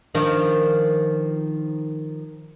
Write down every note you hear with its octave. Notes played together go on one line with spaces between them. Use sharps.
D#3 F3 D4